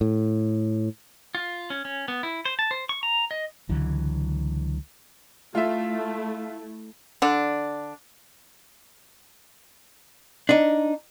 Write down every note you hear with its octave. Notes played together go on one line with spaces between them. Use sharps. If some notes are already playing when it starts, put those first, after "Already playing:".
A2
F4
C#4
C#4
B3
E4
C5
A5
C5
C#6
A#5
D#5
C#2 D3 E3 F#3
A3 E4 F4 E5
D3 D4
D4 D#4